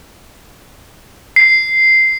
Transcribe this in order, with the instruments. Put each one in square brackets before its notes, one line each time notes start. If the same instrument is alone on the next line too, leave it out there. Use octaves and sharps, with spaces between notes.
[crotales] C7